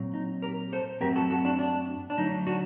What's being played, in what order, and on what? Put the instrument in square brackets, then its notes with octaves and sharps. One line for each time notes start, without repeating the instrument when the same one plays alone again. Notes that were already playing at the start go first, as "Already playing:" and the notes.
Already playing: [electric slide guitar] A#2 F#3 C4
D#4
G4 A#4
A4 C5
F#2 F#3 A3 C4 G4 A#4
F#4 A4
F#4 A4
D4 F#4
D4
D4
D3 F#3 A3 D#4
D4 F#4